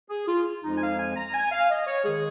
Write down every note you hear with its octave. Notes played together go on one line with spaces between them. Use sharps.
G#4
F4
F2 F3 G#3 D#4
G#5
F5
G#5
A#5
G#5
F5
D#5
C#5
D#3 G#3 G#4